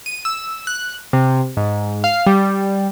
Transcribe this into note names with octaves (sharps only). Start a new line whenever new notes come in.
D#7
E6
F#6
C3
G#2
F5
G3